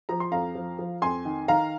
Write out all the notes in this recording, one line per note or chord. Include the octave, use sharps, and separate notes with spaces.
F3 A#5
C6
F2 F5 A#5
F3
F3
F2 G#5 C6
D#3
D#3 F5 A#5